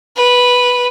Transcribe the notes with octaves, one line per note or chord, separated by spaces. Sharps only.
B4